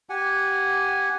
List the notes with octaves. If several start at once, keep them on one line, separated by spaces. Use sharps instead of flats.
G4 F#5 G#5